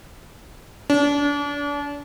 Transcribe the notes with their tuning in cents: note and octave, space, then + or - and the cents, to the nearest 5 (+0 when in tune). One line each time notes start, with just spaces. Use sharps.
D4 -35